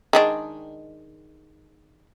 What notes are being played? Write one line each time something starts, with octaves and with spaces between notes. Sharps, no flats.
D#3 G#3 D4